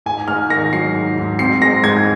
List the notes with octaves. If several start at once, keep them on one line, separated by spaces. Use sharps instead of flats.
G#2 G#5
G#2 F6
D#3 A#6
F#3 C7
G#2
G#2
C4 C7
G#3 A#6
G#2 G#6